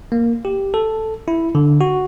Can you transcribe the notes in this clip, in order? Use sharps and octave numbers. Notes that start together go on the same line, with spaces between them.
A#3
G4
A4
E4
D3
F#4